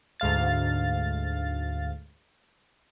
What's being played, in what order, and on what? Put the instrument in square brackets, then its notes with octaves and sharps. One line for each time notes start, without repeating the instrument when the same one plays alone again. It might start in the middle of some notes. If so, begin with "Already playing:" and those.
[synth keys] D2 G#2 F5 A6